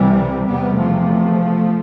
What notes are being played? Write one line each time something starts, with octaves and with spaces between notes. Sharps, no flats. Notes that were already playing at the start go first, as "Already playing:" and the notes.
Already playing: C2 C3 E3 G3
E2 C3 G3 B3
F3 A3